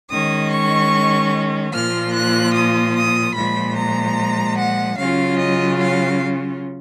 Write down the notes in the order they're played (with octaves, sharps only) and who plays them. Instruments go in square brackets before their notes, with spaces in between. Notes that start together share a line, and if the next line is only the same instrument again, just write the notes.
[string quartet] D#3 G#3 C#4 D#6
C#6
A#2 F3 A#3 F4 F6
F#6
D#6
D#6
A#2 F3 G#3 B5
A#5
F#5
C#3 F#3 C#4 F4 F5
D#5
F5